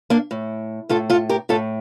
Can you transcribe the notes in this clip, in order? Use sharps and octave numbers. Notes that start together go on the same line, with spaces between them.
A#3 D4
A2
A2 F4 A4
F4 A4
G4 A#4
A2 F4 A4